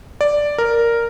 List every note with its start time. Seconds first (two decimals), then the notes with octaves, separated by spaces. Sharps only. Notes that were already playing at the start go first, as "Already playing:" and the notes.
0.21 D5
0.58 A#4